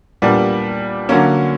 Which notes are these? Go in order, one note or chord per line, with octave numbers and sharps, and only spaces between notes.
A#2 G3 B3 D4
D3 F#3 A#3 C#4